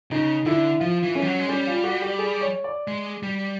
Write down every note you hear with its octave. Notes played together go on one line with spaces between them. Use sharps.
C#3 D#4
D3 E4
F3 F4
E3
C#4
G3
F#3
G#3
G3 C#4
F4
F#4
G4
G#4
C#5
D5
G#3
G3